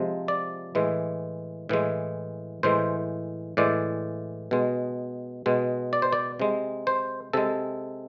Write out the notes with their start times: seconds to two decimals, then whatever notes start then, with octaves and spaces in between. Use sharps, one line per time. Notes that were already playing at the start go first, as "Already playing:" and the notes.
Already playing: C3 F3 G#3
0.28 D5
0.75 A2 E3 G#3
1.69 A2 E3 G#3
2.63 A2 E3 G#3 C5
3.57 A2 E3 G#3 D5
4.51 B2 G#3
5.46 B2 G#3
5.93 D5
6.02 C5
6.13 D5
6.39 C3 G#3
6.87 C5
7.33 C3 G#3 A4